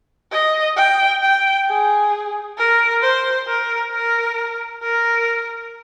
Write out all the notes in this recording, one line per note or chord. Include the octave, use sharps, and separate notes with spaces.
D#5
G5
G5
G#4
A#4
C5
A#4
A#4
A#4